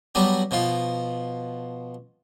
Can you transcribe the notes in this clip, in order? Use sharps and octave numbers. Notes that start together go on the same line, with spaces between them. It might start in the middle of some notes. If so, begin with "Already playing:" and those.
F#3 G3 B3 D4
B2 F3 F4